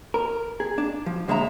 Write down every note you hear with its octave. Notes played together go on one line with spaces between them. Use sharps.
A#4
G#4
D4
F3
D#2 D3 G#3 C#5 E5 A#5